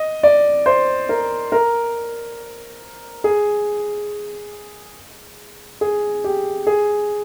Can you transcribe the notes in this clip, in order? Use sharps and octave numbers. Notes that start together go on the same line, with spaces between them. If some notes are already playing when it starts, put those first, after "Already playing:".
Already playing: D#5
D5
C5
A#4
A#4
G#4
G#4
G4
G#4